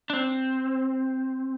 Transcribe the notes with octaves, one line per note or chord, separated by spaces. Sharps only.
D4
C4